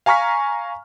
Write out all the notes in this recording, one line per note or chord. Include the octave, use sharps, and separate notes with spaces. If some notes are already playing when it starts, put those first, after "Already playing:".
F5 G#5 A#5 C#6 F6 B6